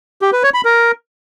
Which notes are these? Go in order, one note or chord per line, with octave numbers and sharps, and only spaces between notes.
G4
B4
C#5
B5
A#4